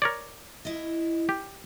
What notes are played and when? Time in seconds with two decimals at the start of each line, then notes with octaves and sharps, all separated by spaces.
0.02 A#4 C#5 D5
0.65 E4 D#5
1.29 G4